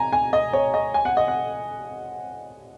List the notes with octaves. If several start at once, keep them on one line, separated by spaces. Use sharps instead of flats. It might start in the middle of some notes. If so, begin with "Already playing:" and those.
Already playing: G#5 A#5
G#5
D#5
C#5
D#5
G#5
F#5
D#5
F#5